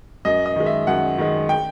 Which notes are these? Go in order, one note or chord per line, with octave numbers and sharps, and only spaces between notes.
F#2 D#5
D#5
D#3 G#3
E5
F#2 F#5
D#3 G#3
G5